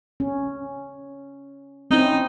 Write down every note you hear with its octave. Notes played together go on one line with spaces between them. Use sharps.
C#4
C4 C#4 D#4 E4